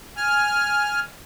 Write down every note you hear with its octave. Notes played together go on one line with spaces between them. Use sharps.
G#5 F6